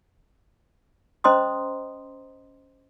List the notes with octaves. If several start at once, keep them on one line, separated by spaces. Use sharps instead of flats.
C#4 C5 D#5 A#5 C6 D#6